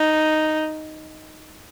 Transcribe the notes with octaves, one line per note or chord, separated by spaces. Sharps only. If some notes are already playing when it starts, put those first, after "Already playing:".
Already playing: D#4